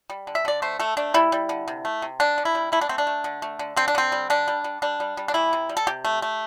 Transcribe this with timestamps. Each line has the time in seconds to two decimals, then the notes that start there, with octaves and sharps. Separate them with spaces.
0.10 G3
0.27 D3
0.35 E5
0.45 D3 D5
0.62 A3 C5
0.79 A3 A4
0.97 A3 D4
1.14 G3 E4
1.32 G3
1.49 D3
1.68 C3
1.85 A3
2.02 C3
2.20 D3 D4
2.38 D3
2.45 E4
2.55 G3
2.72 A3 E4
2.81 D4
2.89 A3 C4
2.98 D4
3.07 A3
3.24 D3
3.42 A3
3.59 D3
3.76 D3 C4
3.88 D4
3.95 D3 C4
4.12 G3
4.30 D3 D4
4.48 G3
4.64 G3
4.82 G3 D4
5.00 G3
5.17 G3
5.28 D4
5.34 E3 E4
5.53 C3
5.69 G3
5.77 A4
5.87 C3 G4
6.05 A3
6.22 A3